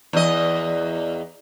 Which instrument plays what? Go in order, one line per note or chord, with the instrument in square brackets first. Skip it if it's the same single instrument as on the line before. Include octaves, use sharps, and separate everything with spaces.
[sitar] E2 D#5